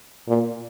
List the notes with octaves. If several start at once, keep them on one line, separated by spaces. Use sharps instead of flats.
A#2